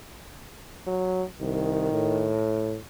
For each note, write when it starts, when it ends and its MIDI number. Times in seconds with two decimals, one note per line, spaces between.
0.87 1.24 54
1.40 1.88 36
1.40 2.36 51
1.92 2.78 45